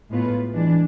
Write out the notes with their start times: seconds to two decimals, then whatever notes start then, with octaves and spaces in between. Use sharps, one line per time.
0.10 A2 G#3 B3 F4 B4
0.54 E3 G#3 D4